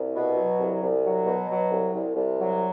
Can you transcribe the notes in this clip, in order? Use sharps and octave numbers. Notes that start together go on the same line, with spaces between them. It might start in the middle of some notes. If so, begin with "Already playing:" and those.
Already playing: C2
B2
F#3
C2
C2
F#3
B2
F#3
C2
C2
C2
F#3